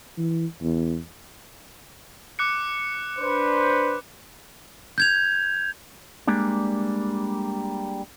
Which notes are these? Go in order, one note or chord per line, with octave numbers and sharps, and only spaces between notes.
E3
E2
D6 F#6 C#7
D4 B4 C5
G6 G#6 F7
G3 G#3 A#3 D4